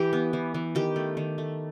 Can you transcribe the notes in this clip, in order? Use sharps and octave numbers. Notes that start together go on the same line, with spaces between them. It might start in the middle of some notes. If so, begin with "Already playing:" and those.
Already playing: E3 G4
B3
E3
E3
D#3 G4
A3
D#3
A3